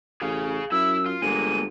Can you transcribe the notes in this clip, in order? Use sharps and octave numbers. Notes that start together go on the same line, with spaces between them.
A1 G#4 F5
F#2 E4 E5 E6
F4
G1 G#3 A#3 D#7